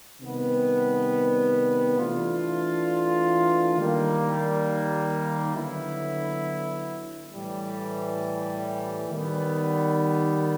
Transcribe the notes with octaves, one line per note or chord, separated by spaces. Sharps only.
C3 D#3 G3 B3
E3 A3 D4 F4
D#3 G3 A#3
D3 F#3 B3 E4
A2 E3 G3
D#3 G3 B3